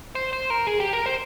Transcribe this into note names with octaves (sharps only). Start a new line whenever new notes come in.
C5
C5
A#4
G#4
G4
A#4
C5